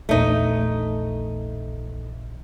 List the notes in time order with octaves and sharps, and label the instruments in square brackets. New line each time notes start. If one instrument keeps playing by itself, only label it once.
[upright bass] A#1 E2 [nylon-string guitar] A3 D#4